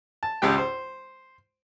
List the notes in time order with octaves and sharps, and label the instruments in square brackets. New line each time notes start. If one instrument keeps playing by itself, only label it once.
[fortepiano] A5
G#1 C#2 G#3 G4 G5
C5